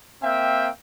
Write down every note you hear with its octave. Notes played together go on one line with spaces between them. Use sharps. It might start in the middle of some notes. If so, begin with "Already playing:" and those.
A#3 C4 E5 F5 G5